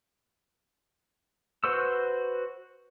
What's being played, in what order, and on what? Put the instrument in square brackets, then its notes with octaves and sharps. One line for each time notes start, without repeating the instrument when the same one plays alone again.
[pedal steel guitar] F#4 B4 C5 C#6 E6